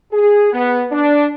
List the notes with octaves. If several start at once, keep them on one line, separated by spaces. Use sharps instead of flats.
G#4
B3
D4